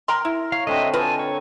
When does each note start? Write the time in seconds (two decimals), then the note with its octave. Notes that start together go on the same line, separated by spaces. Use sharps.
0.08 A#4 G5 A#5 C6
0.25 E4
0.52 C#5 F5
0.67 D3 C4 F#4 D#5 E5
0.94 F4 B4 D#5 G#5 A5
1.19 C#5